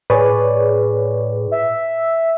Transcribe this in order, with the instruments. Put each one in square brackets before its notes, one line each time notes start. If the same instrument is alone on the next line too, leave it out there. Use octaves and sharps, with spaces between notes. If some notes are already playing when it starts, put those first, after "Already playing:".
[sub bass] A2 [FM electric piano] G#4 C#5 D5 [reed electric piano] B4
[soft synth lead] E5